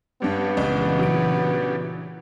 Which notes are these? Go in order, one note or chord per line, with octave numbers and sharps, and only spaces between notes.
G2 G3 B3 C#4 D4 G4
C#2 A#2 C#3 E3
F#3 D7